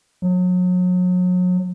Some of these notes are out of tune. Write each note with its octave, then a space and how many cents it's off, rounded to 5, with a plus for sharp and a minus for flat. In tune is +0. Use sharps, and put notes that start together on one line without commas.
F#3 -35